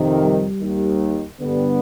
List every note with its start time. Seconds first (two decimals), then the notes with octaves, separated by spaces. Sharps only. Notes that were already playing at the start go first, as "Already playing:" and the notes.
Already playing: F2 C3 D#3
0.22 G3
0.60 D#2 D#3
1.40 G2 D3 G3 B3